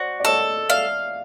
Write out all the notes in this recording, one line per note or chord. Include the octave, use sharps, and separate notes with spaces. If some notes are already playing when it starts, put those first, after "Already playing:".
Already playing: F#4 C5 D5
D5
A4 C#5 D#5
D5 E5 F5